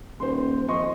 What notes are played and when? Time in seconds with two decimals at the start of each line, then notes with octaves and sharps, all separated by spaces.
0.20 D#1 C5 C6
0.69 F2 D#5 C6 C#6